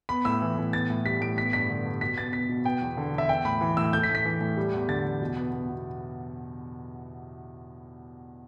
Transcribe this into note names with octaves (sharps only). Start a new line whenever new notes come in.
B3 B5
A2 E6
E3
A2
B3 A6
A2
G3 B6
A2 D7
B3 B6
G2 B6
D3
G2
B2 B6
B3 A6
B3 B6
B2
B3 G5
E2
D3
E2
E5
B3 G5
A2 B5
E3
A2 E6
A3 G6
B6
A2
B6
E3
A2
G3
E2
D3 A6
E2
B2
B3
B3
B2